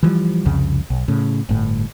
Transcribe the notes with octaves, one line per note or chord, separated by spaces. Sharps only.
E3 F3 G3
C2 F2 C#3
B1
A2 C#3
G1 A2